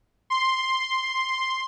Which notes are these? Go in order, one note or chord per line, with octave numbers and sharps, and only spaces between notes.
C6